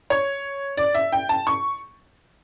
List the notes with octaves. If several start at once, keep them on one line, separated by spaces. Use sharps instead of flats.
C#5
D5
E5
G5
A5
C#6